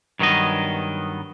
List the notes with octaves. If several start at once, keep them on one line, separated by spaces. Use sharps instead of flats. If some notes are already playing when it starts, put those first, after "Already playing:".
G2 D#3 F#3 B3 D#5